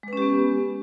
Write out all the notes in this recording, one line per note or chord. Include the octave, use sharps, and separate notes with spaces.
G#3 B3 C#4 G4 B4